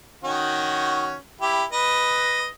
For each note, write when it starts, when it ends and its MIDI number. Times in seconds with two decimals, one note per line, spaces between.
0.23 1.15 51
0.23 1.15 61
0.23 1.15 66
1.41 1.64 64
1.41 1.64 67
1.72 2.46 71
1.72 2.46 75